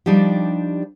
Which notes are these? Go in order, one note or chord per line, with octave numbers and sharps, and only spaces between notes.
F3 G3 D4 D#4 G4